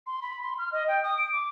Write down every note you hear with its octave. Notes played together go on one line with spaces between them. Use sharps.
C6
B5
C6
F6
D#5
G5
D#6
D7
D6